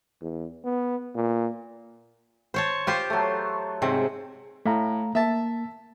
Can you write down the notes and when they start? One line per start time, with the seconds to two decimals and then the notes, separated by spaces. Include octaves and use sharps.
0.21 E2
0.65 B3
1.15 A#2
2.54 C5 C#5 A5
2.87 F4 G4 C5
3.10 F#3 A3
3.82 G#2 C3 C4
4.65 A2 A3 F5 A#5
5.15 A#3 E5 A5